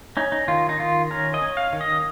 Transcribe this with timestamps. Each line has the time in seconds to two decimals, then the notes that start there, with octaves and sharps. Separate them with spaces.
0.17 C#4 D#4
0.32 D#4
0.48 D#3 F4
0.69 D#4
0.79 D#3 F4
1.11 C#4 A#4
1.34 D#5
1.42 C#4
1.57 F5
1.73 D#3
1.81 D#5